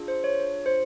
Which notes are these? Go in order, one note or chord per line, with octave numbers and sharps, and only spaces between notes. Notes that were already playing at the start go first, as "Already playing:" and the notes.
Already playing: D4 F4 G#4
C5
C#5
C5